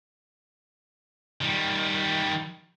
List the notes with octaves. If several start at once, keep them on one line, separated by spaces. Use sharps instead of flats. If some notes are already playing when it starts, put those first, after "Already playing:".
D#3 G3